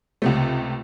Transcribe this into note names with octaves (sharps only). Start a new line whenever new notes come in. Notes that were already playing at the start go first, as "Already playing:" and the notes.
C#2 C3 A3